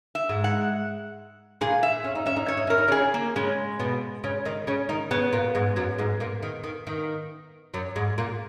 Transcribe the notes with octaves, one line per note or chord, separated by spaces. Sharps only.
E5
G#2 G#3
F#5
A#2 A#3 G#4
E5
C#4
D#4
C#4 E5
D#4
C#4 C#5
D#4
C#4 A#4
D#4
C#3 C#4 G#4
A#3
C#3 G#3 C#4
B2 B3
C#3 C#4
D#3 D#4
C#3 C#4
D#3 D#4
C#3 B3 C#4
A#2 A#3
G#2 G#3
F#2 F#3
G#2 G#3
A#2 A#3
D#3
D#3
D#3
F#2 F#3
G#2 G#3
A#2 A#3